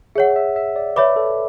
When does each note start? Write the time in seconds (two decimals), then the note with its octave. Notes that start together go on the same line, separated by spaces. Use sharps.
0.15 G#4 C#5 E5 F#5
0.36 E5
0.56 E5
0.76 D5
0.96 B4 C#5 E5 B5 D6
1.16 A4